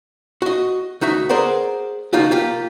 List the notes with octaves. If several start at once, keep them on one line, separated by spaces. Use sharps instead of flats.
F#4 D#5
D2 D#4 F#4 E5
G#4 A#4 C5 D5 F#5
C#3 F3 A#3 D#4 F4 F#4
A#3 F4 G4